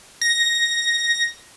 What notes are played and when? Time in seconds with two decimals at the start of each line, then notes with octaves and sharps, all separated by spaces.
0.21 A#6